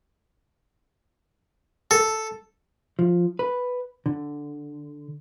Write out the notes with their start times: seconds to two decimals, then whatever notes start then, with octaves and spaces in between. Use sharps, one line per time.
1.91 A4
2.99 F3
3.39 B4
4.06 D3